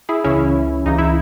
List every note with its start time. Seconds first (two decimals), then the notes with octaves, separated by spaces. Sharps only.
0.09 E4 G#4
0.24 C#2 C#3 E3 C#4 E4
0.86 C#2 C#3 E3 D#4
0.98 E4